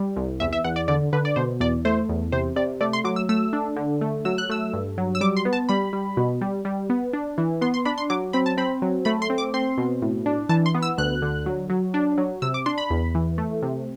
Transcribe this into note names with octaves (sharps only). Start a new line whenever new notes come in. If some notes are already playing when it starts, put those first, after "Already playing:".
Already playing: G3
C2
E2 E5
E5
E2 F#5
D5
D3 D5
D3 B4
D5
B2 C5
E2 D5
A3 C5
E2
C3 C5
C3 D5
A3 D5
C6
F#3 D6
E6
A3 E6
D4
D3
A3
F#3 E6
F#6
A3 E6
G2
F#3
E6
G3 D6
C6
B3
A5
G3 B5
G3
B2
G3
G3
B3
D4
E3
B3 C6
C6
D4 B5
C6
F#3 D6
C4 B5
A5
C4 B5
F#3
A3 B5
C6
C4
D6
C4 C6
B2
A2
D4
E3 A5
C6
B3
E6
D2 F#6
D3
F#3
F#3
D4
F#3
C3 E6
D6
D4 C6
B5
E2
E3
A3
C3